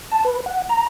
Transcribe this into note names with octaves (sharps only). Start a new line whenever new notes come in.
A5
B4
F#5
A#5